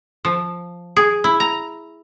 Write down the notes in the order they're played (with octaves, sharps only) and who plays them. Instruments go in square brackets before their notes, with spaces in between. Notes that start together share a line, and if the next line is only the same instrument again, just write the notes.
[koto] F3
G#4
E4
A#5